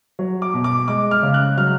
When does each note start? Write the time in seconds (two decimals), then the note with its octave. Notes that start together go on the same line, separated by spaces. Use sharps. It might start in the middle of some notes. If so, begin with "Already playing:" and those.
0.19 F#3
0.42 D6
0.54 B2
0.64 D6
0.88 G#3 D6
1.11 F6
1.23 C#3
1.34 F#6
1.57 F#3 F6